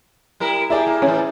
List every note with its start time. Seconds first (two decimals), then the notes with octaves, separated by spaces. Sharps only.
0.40 G3 E4 A#4
0.70 A#3 E4 G4 G#4 D5
0.87 A#3
1.02 A2 E3 C#4